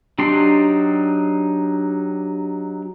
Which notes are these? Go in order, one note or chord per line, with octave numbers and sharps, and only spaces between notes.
F#3 D4 D#4 G4 C6